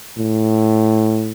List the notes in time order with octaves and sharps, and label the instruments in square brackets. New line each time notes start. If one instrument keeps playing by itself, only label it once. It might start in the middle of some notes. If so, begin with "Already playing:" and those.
[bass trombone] A2